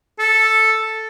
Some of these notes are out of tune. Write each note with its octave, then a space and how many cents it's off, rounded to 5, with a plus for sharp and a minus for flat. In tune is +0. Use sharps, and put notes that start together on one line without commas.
A4 +0